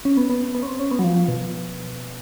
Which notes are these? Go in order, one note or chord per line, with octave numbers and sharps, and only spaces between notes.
C#4
B3
B3
B3
C#4
C4
C#4
B3
F#3
F3
B2